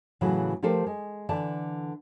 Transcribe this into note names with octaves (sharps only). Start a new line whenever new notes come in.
A2 C#3 E3 F#3
F3 A3 G4 A4 A#4 C5
G#3
D3 E3 D5 A5